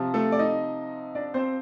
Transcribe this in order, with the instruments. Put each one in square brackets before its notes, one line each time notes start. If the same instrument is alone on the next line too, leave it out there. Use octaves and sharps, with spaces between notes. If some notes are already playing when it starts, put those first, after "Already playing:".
Already playing: [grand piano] C3 F3
A3 A4
D5
D#4 D#5
D4 D5
C4 C5